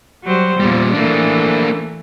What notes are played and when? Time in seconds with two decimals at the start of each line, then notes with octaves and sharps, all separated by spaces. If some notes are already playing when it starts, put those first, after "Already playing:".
0.24 F#3 G3 C5
0.60 E2 A#2 F3 G3
0.93 E3 A3 A#3 D4